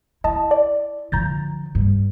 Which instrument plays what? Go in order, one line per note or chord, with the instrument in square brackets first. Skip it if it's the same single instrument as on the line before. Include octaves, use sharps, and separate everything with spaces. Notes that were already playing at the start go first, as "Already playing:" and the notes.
[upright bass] E4 [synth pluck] D#5 A5
[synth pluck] D5
[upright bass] D3 F3 [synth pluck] A#5 G6 A6
[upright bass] G2